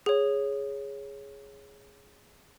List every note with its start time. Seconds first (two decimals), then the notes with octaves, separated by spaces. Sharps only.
0.06 G#4 C#5